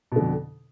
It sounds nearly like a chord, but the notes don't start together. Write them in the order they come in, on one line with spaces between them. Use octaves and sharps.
B2 D3 F2